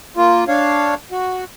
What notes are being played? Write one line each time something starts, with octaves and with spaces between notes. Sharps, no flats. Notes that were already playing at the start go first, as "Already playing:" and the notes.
A#3 F4
D4 C#5 F5
F#4